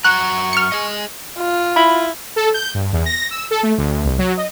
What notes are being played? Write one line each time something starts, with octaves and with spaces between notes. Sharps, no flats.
F#2 F#4 A#5 C#6 F#6
F6 C#7
G#4 D#5
F4
E4 B5
A4
G6
G2
E2
A#6
E6
A4
A3
D2
C2
F#3
D#5